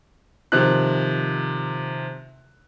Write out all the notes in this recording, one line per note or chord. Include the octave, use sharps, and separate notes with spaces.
C3 D#3 F3 F#6